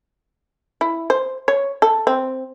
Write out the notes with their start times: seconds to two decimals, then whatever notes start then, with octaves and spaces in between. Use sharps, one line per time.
0.81 E4
1.10 C5
1.48 C#5
1.82 A4
2.07 C4